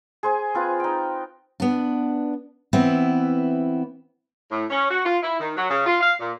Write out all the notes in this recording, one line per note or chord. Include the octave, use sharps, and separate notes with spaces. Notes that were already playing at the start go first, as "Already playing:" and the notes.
G#4 C5 G#5
C4 F4 B4
D#4 G5
B3 D4
E3 B3 C4 E4
A2
C#4
F#4
F4
E4
D#3
F#3
C#3
F4
F5
A#2